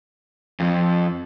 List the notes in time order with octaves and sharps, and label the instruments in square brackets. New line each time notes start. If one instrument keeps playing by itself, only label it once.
[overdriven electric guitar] F2 F3